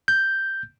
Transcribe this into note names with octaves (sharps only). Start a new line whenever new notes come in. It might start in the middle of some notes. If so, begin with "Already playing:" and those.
G6